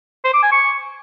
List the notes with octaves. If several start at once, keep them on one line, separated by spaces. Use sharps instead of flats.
C5
D6
G#5
C#6